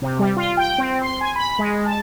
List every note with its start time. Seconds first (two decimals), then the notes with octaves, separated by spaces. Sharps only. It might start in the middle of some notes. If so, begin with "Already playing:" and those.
0.02 C3
0.19 G3
0.36 F4
0.57 G5
0.78 C4
1.02 C6
1.21 G#5
1.36 B5
1.59 G#3
1.86 A5